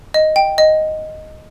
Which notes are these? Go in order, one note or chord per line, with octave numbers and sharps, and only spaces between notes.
D#5
G5
D#5